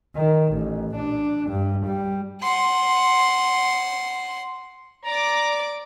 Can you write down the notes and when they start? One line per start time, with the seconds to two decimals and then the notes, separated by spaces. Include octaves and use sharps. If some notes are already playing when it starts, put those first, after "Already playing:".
0.16 D#3
0.54 A1
0.96 D4
1.50 G2
1.86 G3
2.42 F#5 C6
5.05 D5 A#5 D6